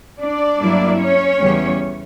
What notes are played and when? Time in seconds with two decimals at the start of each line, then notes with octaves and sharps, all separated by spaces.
0.21 D4 D5
0.60 G2 F#3 A#3 E4
0.99 C#4 C#5
1.38 E2 C#3 G3